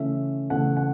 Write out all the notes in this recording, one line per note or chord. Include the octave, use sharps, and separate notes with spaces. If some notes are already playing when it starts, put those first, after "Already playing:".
Already playing: C#3 E3 A3 C#4 E5
C#3 E3 A3 C#4 F#5
F#5